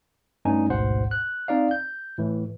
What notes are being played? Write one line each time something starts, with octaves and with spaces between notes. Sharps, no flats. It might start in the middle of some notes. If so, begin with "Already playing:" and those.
G2 A3 C#4 D#4 G#5
A1 D2 G#2 B2 C5 F#5
F#6
C4 D#4 D5 F5
G6
A2 E3